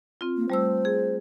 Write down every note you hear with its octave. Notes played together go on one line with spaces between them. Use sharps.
C4 F4
A#3
G3 A3 C5 E6
G#4